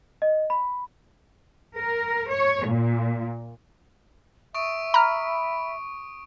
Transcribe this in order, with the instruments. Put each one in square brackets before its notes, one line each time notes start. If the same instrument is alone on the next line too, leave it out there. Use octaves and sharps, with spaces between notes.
[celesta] D#5
B5
[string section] A#4
C#5
A#2
[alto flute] E5 [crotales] C#6 D#6 D7
[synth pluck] A#5 F6 [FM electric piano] B5